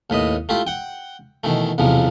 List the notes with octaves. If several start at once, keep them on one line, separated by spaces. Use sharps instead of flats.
D#2 A2 B4 D#5
A3 E4 F4 G4
F#5 G5
B2 D#3 E3 A3
B1 E2 C3 E3 F3